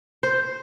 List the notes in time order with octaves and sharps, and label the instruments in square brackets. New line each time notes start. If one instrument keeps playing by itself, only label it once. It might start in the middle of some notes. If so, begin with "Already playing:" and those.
[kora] C5